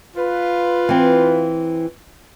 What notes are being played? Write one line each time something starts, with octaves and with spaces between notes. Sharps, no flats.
F4 B4
E3 C4